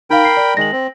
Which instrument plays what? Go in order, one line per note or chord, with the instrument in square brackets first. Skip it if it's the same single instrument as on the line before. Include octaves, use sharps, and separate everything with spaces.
[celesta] D#4 F5 [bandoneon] A#4 G5 B5
[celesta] C7
D5
[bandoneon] D#3 G#3 [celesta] A#6 F#7
[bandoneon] C4